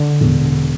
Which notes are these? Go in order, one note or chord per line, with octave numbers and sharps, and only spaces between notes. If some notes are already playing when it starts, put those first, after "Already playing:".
Already playing: D3
E1